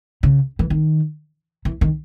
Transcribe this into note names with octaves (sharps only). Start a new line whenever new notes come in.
C#3
E3
D#3
E3
D#3